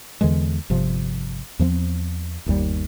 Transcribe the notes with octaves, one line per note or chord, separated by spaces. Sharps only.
E2 D3 E3 G#3
G1 C3 F3
E2 F3 A#3 C4
G1 D#2 A#2 G3